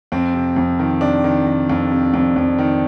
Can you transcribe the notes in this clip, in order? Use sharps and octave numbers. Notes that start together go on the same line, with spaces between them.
F2 C4
C3
F2
D#3
C3 D4
D#3
D#3
F2
C3
F2
F2
D#3